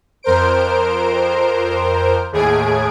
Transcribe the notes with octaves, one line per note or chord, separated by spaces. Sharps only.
F2 A#4 C5 D7
D#2 A2 G#4 G#6 D7